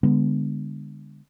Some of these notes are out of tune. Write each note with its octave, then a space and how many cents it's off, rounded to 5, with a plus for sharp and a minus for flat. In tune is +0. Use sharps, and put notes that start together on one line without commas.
D3 +0 G#3 -30 B3 +0